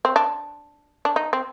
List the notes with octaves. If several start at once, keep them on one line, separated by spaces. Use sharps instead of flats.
C4
D4
D4
D#4
C4